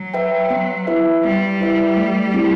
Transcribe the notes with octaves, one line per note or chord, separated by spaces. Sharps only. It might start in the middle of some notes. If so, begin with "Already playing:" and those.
Already playing: F#3
B4 E5 G5
B3
E4 B4 E5
G3 B3
E4 B4 E5
A3
C4 E4 G4